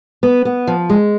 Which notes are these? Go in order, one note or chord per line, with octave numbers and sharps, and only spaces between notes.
B3
B3
F3
G#3